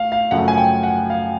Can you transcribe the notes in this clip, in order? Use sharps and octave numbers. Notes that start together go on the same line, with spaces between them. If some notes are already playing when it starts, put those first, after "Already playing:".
Already playing: A3 F5
F5
F#2 C#3 F3 A3 F#5
G#5
G5
F#5
F5